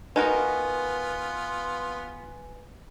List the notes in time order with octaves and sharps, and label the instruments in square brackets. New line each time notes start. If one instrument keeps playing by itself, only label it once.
[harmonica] B3 F4 [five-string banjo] D#4 F#4 A#4 [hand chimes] B4 [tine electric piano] G#5